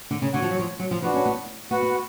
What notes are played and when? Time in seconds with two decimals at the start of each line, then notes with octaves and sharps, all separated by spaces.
0.11 D3
0.22 C#3
0.33 D3 F#4 C#5 F#5
0.42 F3
0.51 F#3
0.59 F3
0.80 F#3
0.91 F3
1.02 F3 D4 F#4 B4
1.14 C#4
1.26 B3
1.71 B3 F#4 B4 F#5
1.82 B3